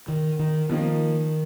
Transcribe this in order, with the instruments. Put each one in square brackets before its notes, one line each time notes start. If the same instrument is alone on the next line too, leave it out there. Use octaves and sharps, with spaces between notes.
[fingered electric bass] D#3
D#3
[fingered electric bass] D#3 [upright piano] F3 A#3 D#4